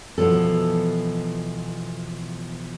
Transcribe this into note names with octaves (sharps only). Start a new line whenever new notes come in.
B2 E3 F3 A4